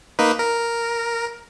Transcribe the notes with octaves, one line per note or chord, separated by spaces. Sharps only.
A#3 D#4 B4
A#4